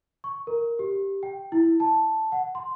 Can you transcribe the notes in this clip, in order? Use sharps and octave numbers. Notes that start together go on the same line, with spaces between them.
C#6
A#4
G4
G5
E4
A5
F#5
C6